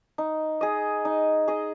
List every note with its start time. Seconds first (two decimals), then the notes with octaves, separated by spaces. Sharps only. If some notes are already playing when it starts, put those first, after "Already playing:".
0.18 D#4
0.61 G#4 D#5
1.05 D#4
1.48 G#4 D#5